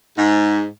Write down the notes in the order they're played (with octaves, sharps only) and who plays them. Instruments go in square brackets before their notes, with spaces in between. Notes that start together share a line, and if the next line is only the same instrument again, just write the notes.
[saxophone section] G#2